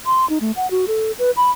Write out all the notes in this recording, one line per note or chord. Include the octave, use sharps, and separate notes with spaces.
C6
D#4
A3
F#5
F#4
A4
B4
B5